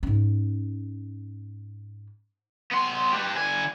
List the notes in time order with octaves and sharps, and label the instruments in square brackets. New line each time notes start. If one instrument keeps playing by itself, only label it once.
[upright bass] G#2 C#4
[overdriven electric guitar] B3 C6
G4 B4
D3 G#5